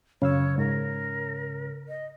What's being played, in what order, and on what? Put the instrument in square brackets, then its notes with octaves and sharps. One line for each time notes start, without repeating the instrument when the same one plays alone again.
[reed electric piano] F#2 F5 E6 [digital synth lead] C#3 [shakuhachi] C#5
[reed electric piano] G#2 [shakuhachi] A#4
[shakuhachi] D#5